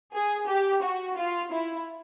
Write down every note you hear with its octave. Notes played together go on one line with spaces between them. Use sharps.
G#4
G4
F#4
F4
E4